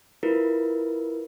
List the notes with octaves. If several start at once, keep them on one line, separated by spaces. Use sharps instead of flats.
E4 F4 A#4 B4